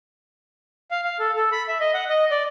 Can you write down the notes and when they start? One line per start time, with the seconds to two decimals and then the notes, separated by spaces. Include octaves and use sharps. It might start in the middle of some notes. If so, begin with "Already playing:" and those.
0.91 F5
1.04 F5
1.19 A4
1.36 A4
1.52 B5
1.68 E5
1.80 D#5
1.94 F#5
2.09 D#5
2.31 D5